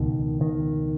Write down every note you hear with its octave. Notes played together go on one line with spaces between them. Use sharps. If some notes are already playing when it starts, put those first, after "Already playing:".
Already playing: C#2 B2 D#3
D#3